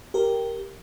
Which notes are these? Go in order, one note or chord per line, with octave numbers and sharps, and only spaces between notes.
G4 A#4